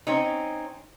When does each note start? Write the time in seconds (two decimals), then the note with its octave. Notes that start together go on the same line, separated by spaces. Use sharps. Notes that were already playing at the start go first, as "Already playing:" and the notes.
0.07 C4 C#4 D#4